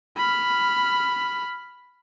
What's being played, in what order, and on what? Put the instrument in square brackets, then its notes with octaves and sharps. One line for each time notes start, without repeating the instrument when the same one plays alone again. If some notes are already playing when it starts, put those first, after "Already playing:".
[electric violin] B5 F6